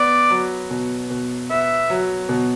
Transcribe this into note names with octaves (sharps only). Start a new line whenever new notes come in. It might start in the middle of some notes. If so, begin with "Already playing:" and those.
Already playing: B3 D5
F#3
B2
B2
B3 E5
F#3
B2